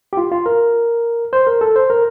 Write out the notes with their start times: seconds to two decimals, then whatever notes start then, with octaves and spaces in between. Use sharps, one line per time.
0.13 G4
0.17 F4
0.32 F4
0.46 A#4
1.33 C5
1.47 A#4
1.61 A4
1.76 C5
1.90 A#4